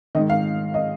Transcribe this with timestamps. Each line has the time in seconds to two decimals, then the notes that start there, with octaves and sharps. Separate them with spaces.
0.15 G#2 D#3 D#5
0.30 F5
0.74 D#5